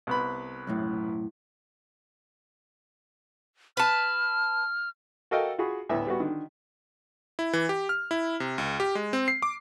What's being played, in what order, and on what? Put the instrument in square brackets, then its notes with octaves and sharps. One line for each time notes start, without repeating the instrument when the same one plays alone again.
[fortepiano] C2 B3 B5
[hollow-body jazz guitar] B1 F#2 A2
[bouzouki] B4 A5 [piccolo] F6
[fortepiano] F#4 A4 A#4 D#5 F5 G5
F4 F#4 G#4 B5
D2 A2 B3 E5
G3 B3 F#4
D3 D#3
[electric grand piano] E4
E3
G4
F6
E4
C3
C#2
G4
G#3
C4
C7
D6